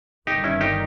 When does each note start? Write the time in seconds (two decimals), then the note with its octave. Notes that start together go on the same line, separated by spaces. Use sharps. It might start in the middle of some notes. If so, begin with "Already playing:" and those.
0.27 G1 G2 D#3 D#4 G4
0.44 C#4 E4
0.61 D#4 G4